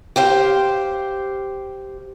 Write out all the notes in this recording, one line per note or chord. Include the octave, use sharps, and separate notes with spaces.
G4 C5 F5